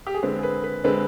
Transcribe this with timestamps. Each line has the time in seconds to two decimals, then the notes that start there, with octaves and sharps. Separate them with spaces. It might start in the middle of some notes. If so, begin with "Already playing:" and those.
0.07 G4
0.14 G#4
0.23 D3 G#3 C4 B4
0.39 G#4
0.43 B4
0.64 B4
0.84 D3 G#3 C4 B4